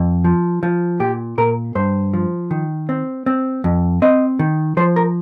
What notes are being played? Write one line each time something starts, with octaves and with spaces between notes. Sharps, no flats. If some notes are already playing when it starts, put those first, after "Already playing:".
Already playing: F2
F3
F3
A#2 G4
A#2 A#4
G2 C5
F3
D#3
C4
C4
F2
C4 D#5
D#3
F3 C5
A#4